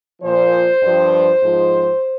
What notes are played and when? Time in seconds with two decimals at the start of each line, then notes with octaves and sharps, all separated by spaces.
0.21 A#2 F3 C5
0.82 G2 F3
1.43 G#2 F3